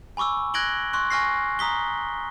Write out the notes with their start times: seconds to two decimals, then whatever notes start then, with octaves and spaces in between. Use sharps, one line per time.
0.17 G#5 B5 C#6 D6 E6
0.54 F#6 G#6 A#6 D7 F#7 G7
0.93 C6 C#6 F#6
1.10 G#5 C#6 F6 A#6 C7
1.59 A#5 D#6 B6 G7